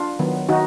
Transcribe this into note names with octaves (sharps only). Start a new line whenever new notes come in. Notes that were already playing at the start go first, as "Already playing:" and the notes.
Already playing: D4 F4
D#3 F#3 B3
D#3 D#4 F#4